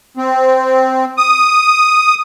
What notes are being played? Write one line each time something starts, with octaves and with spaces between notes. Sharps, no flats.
C4
D#6